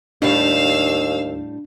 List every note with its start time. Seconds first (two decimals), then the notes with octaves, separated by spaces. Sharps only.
0.22 D#2 A2 G3 D4 F5 E6